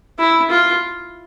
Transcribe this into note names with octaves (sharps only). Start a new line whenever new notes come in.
E4
F4